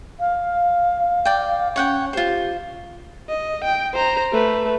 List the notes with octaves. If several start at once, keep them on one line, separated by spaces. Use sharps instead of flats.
F5
D5 G5
C#4 C#5 F#5 G5
F4 G4 C5
D#5
G5
C5 A#5
A3 B4